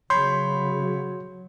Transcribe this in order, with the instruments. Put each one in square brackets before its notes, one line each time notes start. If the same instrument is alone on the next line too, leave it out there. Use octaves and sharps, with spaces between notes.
[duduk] C#3 [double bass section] F#3 [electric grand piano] C#5 B5 G6 [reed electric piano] C6